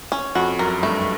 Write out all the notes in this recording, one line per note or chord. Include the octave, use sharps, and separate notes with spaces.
C#4
F2 F#4
F#2 A#4
G2 A3